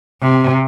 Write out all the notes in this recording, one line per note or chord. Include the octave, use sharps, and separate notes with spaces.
C3